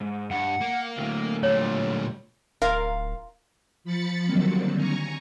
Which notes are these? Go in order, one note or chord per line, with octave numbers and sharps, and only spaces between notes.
G#2
G2 F#5
A#3
D2 A2
A#2 G3 C#5
D1 F4 A#4 F5
F3 B5 A6 C#7
D3 D#3 F#3 G3 A#3 C4
G#5 A#5 C#6